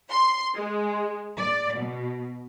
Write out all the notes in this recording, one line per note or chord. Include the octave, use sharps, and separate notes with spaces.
C6
G#3
D5
B2